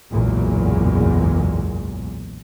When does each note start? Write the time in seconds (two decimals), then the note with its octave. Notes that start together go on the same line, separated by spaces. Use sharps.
0.11 F#1 B1 E2 A#2 F#3 G#3